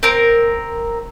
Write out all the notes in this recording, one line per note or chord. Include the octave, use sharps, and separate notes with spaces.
C4 A#4